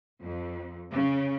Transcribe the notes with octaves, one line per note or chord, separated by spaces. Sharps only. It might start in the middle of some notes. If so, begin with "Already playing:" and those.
F2
C#3